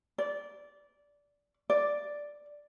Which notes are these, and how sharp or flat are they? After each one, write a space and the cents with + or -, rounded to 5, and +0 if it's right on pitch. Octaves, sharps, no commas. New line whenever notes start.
D5 -15
D5 +0